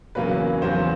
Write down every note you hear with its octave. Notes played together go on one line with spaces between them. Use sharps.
E2 C#3 F#3 A#3 C#4 B4
E2 C#3 F#3 A#3 C#4 C5